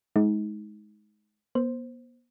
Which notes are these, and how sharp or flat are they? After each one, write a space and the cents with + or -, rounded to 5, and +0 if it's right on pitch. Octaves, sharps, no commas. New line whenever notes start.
G#3 +25 D#4 +30
B3 -40 C5 +0